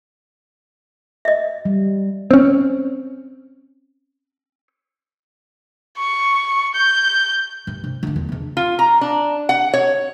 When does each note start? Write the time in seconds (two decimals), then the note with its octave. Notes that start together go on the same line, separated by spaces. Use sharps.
1.25 D#5 E5
1.65 G3
2.31 C4 C#4
5.98 C#6
6.75 G6
7.67 G2
7.84 C3
8.03 D3 C#4
8.16 E2
8.29 C#3 D4
8.57 F4
8.79 A#5
9.01 D4
9.49 F#5
9.74 C#5